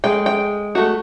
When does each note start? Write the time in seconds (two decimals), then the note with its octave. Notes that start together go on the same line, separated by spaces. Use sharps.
0.04 G#3 G5
0.26 G5
0.75 A3 F#4